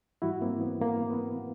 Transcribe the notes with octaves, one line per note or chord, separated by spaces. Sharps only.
G#2 E3 G3 E4 F#4
A#3 C4
B3
A#3
B3